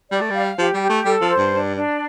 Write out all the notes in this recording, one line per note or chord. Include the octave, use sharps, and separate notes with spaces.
G3 D5
A3
G3 F5
F3 G4
G3
G4
A3
G3 A4
F3
C5
G2
D4
D4